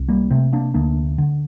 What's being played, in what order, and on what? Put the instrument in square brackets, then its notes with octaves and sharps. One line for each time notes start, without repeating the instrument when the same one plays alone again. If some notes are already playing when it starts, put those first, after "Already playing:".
Already playing: [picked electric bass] C2
G3 A#3
C3 A3 C4
A#3 D4
D2 A#3 D4
D3